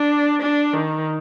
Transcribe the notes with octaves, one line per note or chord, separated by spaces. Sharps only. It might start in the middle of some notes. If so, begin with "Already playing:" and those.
Already playing: D4
D4
D#3